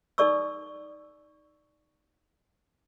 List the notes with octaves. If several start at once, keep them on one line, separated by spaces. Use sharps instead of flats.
D#4 A4 D5 C#6 E6